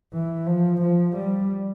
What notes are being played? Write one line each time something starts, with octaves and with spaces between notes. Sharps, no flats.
E3
F3
F3
G3